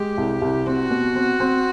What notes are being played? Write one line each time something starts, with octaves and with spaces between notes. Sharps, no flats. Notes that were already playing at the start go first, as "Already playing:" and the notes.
Already playing: G#3 G4
C2
C2
C4 F#4
B2
C4
C4